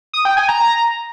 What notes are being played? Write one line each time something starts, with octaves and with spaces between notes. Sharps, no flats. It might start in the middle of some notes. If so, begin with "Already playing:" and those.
D#6
G5
G#5
A#5